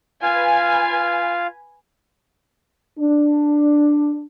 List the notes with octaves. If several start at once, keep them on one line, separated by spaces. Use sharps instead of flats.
F4 B4 F5 G#5
D4